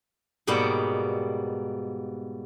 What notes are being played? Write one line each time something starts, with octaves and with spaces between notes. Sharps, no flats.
G#2 B2 G3 A#3 B3